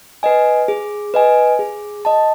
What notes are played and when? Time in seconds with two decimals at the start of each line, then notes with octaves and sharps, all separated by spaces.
0.23 B4 D#5 G#5
0.68 G#4
1.14 B4 D#5 G#5
1.59 G#4
2.05 D#5 A5